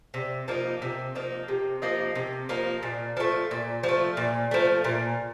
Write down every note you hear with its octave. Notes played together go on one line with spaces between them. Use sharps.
C3
F3 A#3 D#4
C3
F3 A#3 D#4
C3
F3 A#3 D#4
C3
F3 A#3 D#4
A#2
F3 A3
A#2
F3
A3
A#2
F3 A3
A#2